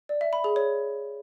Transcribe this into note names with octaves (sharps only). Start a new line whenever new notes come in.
D5
E5
B5
G#4
C#5